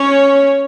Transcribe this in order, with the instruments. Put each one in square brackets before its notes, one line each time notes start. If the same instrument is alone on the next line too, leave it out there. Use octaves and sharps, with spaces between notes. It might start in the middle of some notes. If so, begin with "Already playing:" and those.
Already playing: [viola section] C#4 C#5